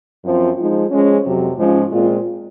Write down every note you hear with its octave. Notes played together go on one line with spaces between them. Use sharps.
F#2 F3 C4 F4
F3 G#3 D#4
F3 G#3 C#4
F2 C3 F#3
G#2 F3 G#3 C#4 F4
A#2 G#3 C4 F4